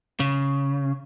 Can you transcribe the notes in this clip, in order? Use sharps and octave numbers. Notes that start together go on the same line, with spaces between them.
C#3